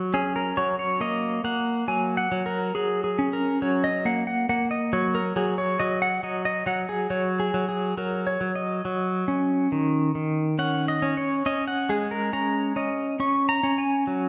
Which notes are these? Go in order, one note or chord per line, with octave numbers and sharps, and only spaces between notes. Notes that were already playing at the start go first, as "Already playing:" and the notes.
Already playing: F#3
C#4 G#4
A#4
F#3 C#5
C#5
A#3 D#5
A#3 F#5
F#3 G#5
F#5
F#3
A#4
F#3 G#4
G#4
C#4
A#4
F#3 C#5
D#5
A#3 F#5
F#5
A#3 F#5
D#5
F#3 C#5
A#4
F#3 G#4
C#5
F#3 D#5
F#5
F#3 D#5
D#5
F#3 F#5
G#4
F#3 C#5
G#4
F#3
G#4
F#3 A#4
C#5
F#3
D#5
F#3
C#4
D#3
D#3
C#4 F#5
D#5
C#4
C#5
C#4 D#5
F#5
G#3 G#4
A#4
C#4 A#5
C#4 D#5
C#4 C#6
A#5
C#4
G#5
F#3